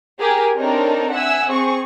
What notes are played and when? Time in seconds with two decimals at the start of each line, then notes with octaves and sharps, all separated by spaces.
0.20 G4 G#4 A#4 G#5
0.55 C4 D4 D#4 A4 A#4 C#5
1.13 E5 F#5 G#5 E6
1.47 C4 G#4 C#6